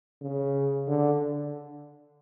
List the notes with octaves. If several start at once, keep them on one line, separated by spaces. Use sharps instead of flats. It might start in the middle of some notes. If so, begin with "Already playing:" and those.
C#3
D3